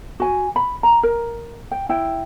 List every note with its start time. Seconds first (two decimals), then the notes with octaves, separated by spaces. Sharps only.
0.20 F#4 G#5
0.56 B5
0.83 A#5
1.03 A#4
1.71 G5
1.89 E4 G5